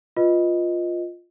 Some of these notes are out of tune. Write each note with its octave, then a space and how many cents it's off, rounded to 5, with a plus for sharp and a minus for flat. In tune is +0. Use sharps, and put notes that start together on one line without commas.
F4 +5 B4 +0 D#5 +0